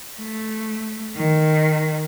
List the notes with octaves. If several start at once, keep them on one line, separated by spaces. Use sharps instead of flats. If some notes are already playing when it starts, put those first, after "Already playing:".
A3
D#3